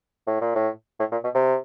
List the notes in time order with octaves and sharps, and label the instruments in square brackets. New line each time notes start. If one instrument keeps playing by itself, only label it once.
[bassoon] A2
A#2
A2
A2
A#2
B2
C3